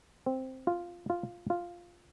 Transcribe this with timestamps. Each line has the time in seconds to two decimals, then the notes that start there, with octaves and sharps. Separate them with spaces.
0.26 C4
0.67 F4
1.10 F4
1.50 F4